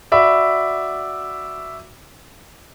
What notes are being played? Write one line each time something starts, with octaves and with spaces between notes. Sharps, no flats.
F#4 D5 E5 B5